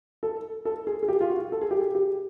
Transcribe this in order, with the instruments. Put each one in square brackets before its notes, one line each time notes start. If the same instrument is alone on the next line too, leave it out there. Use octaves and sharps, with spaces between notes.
[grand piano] A4
A4
G#4
G#4
G4
F4
F#4
A4
G#4
G4
G#4
G4